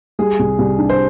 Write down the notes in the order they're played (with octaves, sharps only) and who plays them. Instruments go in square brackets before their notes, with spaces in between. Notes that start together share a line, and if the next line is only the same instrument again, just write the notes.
[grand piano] G3 [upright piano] G#4
[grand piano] C2
C2
D4
[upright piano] C5